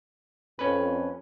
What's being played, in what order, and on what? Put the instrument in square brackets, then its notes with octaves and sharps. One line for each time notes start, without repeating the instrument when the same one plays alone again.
[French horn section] F2 [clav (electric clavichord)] C#4 B4